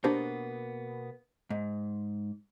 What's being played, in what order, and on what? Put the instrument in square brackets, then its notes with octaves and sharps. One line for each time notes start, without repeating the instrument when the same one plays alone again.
[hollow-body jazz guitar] B2 A#3 B3 [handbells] D4 G4 C5
[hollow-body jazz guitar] G#2